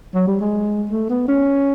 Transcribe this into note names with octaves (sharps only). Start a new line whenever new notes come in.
F#3
G3
G#3
A3
B3
C#4